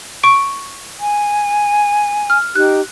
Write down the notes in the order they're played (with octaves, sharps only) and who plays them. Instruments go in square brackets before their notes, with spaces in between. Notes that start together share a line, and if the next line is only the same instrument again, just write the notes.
[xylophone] C#6 D7
[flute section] G#5
[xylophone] F6
[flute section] D#4 G4 [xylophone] F#6